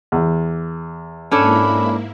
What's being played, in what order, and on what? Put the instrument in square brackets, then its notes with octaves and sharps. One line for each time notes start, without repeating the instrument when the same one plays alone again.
[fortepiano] E2
[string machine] G#2 A#3 E4 [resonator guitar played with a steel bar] C#4 D4 A4 [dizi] B5